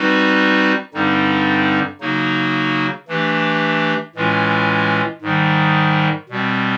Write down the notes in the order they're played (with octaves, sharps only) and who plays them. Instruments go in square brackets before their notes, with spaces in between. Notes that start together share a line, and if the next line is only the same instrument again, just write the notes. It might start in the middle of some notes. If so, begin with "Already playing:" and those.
Already playing: [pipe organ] G3 C4 D#4 F#4 B4
G2 D3 G3 C4 D#4
C#3 F#3 A#3 D#4 F#4
E3 A3 D4 G4
A2 E3 G#3 C#4 F4
G#2 D#3 G3
B2 G3 C4